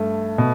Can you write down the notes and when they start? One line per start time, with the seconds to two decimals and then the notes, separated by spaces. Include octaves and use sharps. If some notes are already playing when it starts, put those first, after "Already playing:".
Already playing: G2 A3
0.38 B2